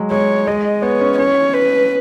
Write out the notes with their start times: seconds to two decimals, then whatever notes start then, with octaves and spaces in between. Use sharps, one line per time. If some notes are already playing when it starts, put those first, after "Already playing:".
Already playing: F#3 G#3
0.11 G#3 C#5
0.47 G#3 D#5
0.82 B3 C#5
1.01 C#4
1.18 C#4 C#5
1.53 B4